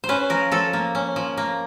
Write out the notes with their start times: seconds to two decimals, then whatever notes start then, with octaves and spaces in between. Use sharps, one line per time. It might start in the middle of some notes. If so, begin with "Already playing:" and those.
0.04 C5
0.09 C#4 B4
0.30 F3 A#4
0.52 F3 A4
0.73 A#3
0.95 C#4
1.16 F3
1.37 A#3